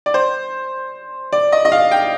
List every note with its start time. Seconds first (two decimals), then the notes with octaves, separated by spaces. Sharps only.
0.06 D5
0.14 C5
1.33 D5
1.52 D#5
1.65 D#5
1.72 F5
1.91 G5